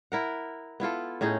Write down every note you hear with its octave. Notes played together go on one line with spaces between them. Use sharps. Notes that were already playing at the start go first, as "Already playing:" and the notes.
E4 A#4 F#5
B3 E4 F4 A4
A2 C#4 D#4 G#4